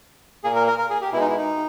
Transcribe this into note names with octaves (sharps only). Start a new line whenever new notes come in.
A#2 A#3 G#4
A#4
A#4
A#4
G#4
G4
B2 G#3 E4
D#4
E4
D#4